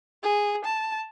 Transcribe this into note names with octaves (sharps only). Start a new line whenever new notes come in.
G#4
A5